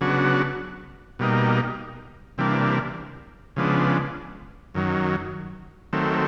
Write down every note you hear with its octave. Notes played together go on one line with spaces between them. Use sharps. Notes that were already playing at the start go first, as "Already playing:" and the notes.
C#3 F#3 B3 D4 F#4
B2 G3 A#3 D#4
C3 E3 G3 A#3 D4
C#3 F3 G#3 B3 D4
F#2 D#3 F#3
D#3 F#3 A3 C4